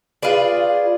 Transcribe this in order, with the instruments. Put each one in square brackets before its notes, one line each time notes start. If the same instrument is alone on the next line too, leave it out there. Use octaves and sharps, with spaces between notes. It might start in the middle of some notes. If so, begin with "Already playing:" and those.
[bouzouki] F4 G#4 B4 D5